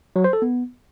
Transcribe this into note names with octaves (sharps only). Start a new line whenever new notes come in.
F#3
C5
A4
B3